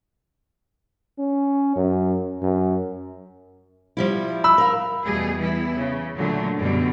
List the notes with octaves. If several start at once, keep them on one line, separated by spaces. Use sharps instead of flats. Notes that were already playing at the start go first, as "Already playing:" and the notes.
C#4
F#2
F#2
F3 G3 E4
B5 E6
A#4 F5
E2 B2 G3 A3 G#4
E3 G3 B3 E4
C#3
A#2 D3 F#3 A3
F#2 B2 D3 G3